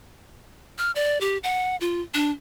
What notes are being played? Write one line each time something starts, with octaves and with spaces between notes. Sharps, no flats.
F6
D5
G4
F#5
F4
D4